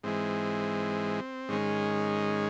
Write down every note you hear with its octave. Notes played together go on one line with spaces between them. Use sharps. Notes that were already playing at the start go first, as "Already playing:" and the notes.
G#2 E3 G#3 C4
G#2 D#3 G#3 C#4